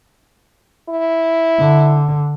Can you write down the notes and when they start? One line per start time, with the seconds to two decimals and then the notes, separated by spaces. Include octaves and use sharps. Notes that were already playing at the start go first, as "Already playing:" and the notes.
0.89 E4
1.60 D3